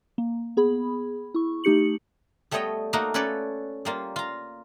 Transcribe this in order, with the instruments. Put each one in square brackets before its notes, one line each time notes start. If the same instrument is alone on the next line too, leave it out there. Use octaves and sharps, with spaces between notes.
[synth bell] A#3
B3 G#4 B5
E4 C#6
A3 D#4 G4 C#7 F#7
[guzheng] G3 A3 B3 C#5 D#5 G5
A3 A#3 D#4 F#4 A#4
C#4 A4 B4 C#5 D5
G3 A#3 F4
F4 A#5